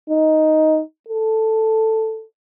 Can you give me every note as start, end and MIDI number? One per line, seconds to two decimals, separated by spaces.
0.10 0.81 63
1.09 2.25 69